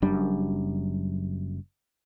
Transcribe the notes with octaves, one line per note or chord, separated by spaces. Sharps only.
F#1 F#2 G3 D4